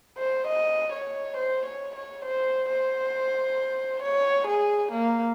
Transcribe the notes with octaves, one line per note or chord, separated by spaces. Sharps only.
C5
D#5
C#5
C5
C#5
C#5
C5
C5
C#5
G#4
A#3